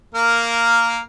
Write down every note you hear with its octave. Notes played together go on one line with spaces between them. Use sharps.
A#3 A#4